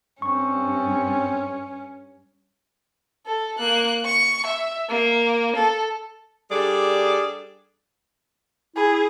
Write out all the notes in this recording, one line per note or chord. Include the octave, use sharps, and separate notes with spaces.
G2 C4 C#4 C#6
A4
A#3 F#6
C#6
E5
A#3
A4
G3 D4 G#4 A4 D5
E4 G#4